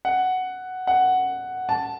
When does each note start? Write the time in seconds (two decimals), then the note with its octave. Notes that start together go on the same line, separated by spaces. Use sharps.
0.05 F#5
0.87 F#5
1.69 A5